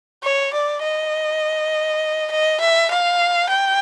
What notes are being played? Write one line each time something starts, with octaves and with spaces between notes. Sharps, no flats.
C#5
D5
D#5
D#5
E5
F5
G5